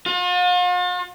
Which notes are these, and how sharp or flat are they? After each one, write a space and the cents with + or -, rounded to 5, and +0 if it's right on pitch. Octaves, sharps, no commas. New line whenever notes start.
F4 +45